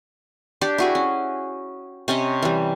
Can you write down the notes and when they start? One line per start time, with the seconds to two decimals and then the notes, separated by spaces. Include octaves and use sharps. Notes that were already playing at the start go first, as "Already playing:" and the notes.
0.61 D4 G4 D5
0.78 E4 F#4 G#4
0.95 C#4
2.08 C3 C#4 C#5 D#5
2.42 E3 G3